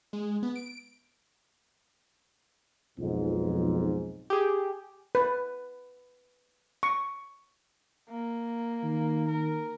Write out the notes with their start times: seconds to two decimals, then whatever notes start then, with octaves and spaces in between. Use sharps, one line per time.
0.13 G#3
0.43 B3
0.55 D7
2.98 B1 F2 G#2
4.30 G4 G#4
5.15 B4
6.83 C#6
8.09 A#3
8.83 D#3
9.28 A#4